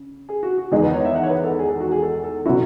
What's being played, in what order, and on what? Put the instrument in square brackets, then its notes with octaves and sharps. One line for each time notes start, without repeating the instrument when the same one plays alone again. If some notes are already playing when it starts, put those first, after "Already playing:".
Already playing: [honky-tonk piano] C#3
[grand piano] G#4
F#4
F#4
[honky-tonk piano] E2 D#3 G#3 D#4 [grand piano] G#4
[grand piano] B4
C#5
E5
F#5
C#5
B4
A4
G#4
A4
F#4
G#4
A4
A4
[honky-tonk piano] B2 F#3 C#4 E4 [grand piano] F#4